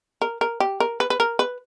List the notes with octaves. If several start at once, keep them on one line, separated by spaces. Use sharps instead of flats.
A#4
A#4
G4
A#4
B4
B4
A#4
B4